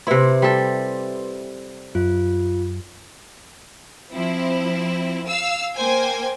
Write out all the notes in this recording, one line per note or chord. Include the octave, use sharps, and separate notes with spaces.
C3 E4 B4 C6
G3 A4
F#2 F4
F3 C4 E4
F5 E6
A#3 C5 G5 G#5